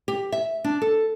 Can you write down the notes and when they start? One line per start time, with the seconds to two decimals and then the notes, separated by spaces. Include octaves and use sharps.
0.08 G4
0.32 E5
0.64 D4
0.82 A4